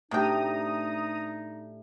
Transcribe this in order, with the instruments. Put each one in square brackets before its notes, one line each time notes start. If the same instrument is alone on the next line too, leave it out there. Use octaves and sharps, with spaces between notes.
[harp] A2 D4 G4 [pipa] C3 G5 [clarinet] D#4 [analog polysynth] A#5 D#6